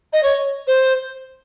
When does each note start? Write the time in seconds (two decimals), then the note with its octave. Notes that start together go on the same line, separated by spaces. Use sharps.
0.13 D#5
0.23 C#5
0.67 C5